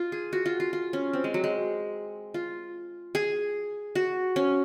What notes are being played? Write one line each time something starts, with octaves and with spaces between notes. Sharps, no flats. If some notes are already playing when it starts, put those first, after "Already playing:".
Already playing: F4
G#4
F#4
F4
F4
F4
C#4
C4
G#3
F#3
G#3
F4
G#4
F#4
C#4